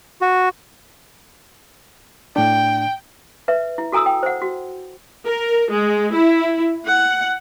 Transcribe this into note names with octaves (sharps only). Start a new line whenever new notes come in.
F#4
A2 D4 G5
B4 E5
E4
F#4 A4 G#5 A#5 D#6 E6
G5
C5 F#5
F#4
A#4
G#3
E4
F#5